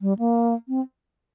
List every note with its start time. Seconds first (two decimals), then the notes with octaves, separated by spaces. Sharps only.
0.02 G3
0.19 A#3
0.68 C4